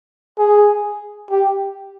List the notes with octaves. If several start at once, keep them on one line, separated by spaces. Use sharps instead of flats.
G#4
G4